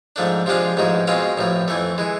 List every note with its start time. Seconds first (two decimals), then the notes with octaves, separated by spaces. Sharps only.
0.16 G#2 F3 A3 D4
0.46 C3 F3 G#3 D4 F4
0.77 A1 G#2 F3 G#3
1.07 B2 G#3 C4 F4
1.37 A1 A2 F3
1.68 F2 E3 A3
1.98 E3 G#3